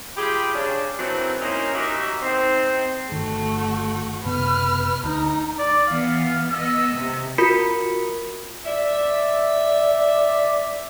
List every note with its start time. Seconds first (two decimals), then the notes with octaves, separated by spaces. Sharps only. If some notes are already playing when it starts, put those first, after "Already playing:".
0.17 G3 F4 G4 G#4 G5 B5
0.53 C#3 D4
0.97 D#3 E3 F#3 C4 D4 E4
1.40 A#3 C#4 D#4 E4 A#4 C5
1.73 F#3 D#4 F#4 G4 A#4 E5
2.22 C4 D#4
3.12 G1 D#3 A3 F#4
4.25 F#1 C3 B3 B4 F6
5.04 D2 D#4 A#5
5.59 D5
5.88 E3 B3 F5
6.50 B3 D#5 E6
6.95 C3
7.38 F4 F#4 A#4 B5 B6 C#7
8.66 D5 E5